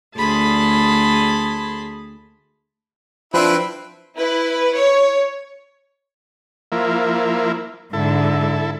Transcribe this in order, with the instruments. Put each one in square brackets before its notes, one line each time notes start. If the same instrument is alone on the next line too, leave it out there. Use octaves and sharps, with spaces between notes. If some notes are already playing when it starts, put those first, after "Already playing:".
[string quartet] D2 G#4 A5 B5 C6
[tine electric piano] F3 D4 [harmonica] C4 E4 B4
[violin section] E4 B4
C#5
[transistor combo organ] F3 A#3 E4
[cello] G#2 D3 [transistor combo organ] E4 A4